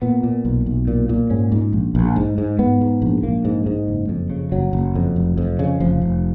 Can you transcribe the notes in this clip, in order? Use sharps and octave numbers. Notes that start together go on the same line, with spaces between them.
A#2 B3
A#2
B1
B1
A#2
A#2
G#2 C#4
G#2
A#1
A#1
G#2
G#2
G#2 B3
G#2
A#1
A#1 A#3
G#2
G#2
F#1
F2
C#3
F#1 F#3
F#1
F2
F1
F2
C#3
F1 F3
F1